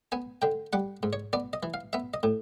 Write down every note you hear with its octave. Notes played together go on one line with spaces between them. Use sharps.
B3 G#5
D3 G5
G3 F#5
G#2
C#5
B3 D5
D#5
E3
F5
B3 E5
D#5
A2